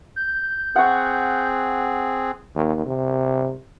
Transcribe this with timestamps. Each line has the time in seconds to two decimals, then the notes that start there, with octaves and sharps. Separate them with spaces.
0.16 G6
0.76 C4 G#4 F#5 C#6
2.55 D#2
2.86 C3